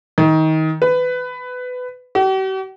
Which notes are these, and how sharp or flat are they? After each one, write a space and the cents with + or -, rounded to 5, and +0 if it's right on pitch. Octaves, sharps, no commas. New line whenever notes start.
D#3 +25
B4 +20
G4 -45